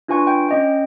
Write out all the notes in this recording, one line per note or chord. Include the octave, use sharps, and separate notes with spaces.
D4 F4 B4 G#5 C#6 G#6
G5
C#4 D#5 G5